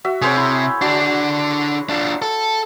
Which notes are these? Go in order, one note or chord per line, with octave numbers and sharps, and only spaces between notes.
F#4 E5
C3 G#4 C5 C#5
E4
D3 D4 F#4
D4 F4
A4